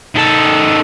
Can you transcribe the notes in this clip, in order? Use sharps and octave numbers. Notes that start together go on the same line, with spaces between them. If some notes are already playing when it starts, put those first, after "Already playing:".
D#3 A4